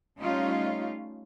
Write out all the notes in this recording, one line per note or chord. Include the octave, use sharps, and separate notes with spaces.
G3 A3 C#4 D#4 F4